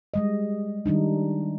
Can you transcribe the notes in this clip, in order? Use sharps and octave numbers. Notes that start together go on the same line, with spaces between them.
G3 G#3 D#5
D#3 G3 D4 D#4